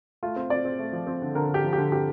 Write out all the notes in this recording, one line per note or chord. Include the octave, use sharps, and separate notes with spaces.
A3 F4
C4
C4 D5
C4
A3
F3
C4
D3
D3 A#4
D3
G4
F3
G4
D3
C4 G4